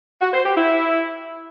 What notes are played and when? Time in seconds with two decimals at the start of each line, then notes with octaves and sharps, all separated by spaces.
0.20 F#4
0.32 C5
0.44 G4
0.56 E4